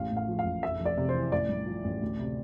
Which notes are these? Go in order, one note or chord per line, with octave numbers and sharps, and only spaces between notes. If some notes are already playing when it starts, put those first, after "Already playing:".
Already playing: A1 F5
A2
F5
F3
F5
A1
F1 E5
F2
D5
C3
C5
E3
A1 D5
G2
F3
A1
D2
C3